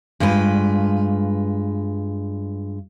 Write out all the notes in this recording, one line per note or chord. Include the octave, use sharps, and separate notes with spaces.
G2 G#3 F4 G4 B4